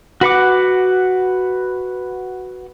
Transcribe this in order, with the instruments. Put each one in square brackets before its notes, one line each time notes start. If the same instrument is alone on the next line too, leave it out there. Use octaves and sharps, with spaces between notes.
[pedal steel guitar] F#4 B4 F#5 D6